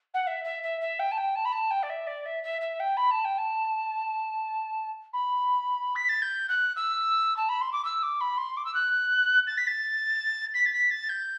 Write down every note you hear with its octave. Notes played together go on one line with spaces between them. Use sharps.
F#5
E5
E5
E5
E5
G5
A5
G5
A5
B5
A5
G5
D5
E5
D5
E5
E5
E5
G5
B5
A5
G5
A5
B5
B6
A6
G6
F#6
E6
A5
B5
C6
D6
E6
D6
B5
C6
D6
E6
F#6
A6
B6
A6
B6
A6
B6
A6
G6